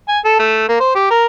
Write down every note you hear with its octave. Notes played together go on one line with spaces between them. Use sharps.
G#5
A4
A3
A#3
C5
G4
A#4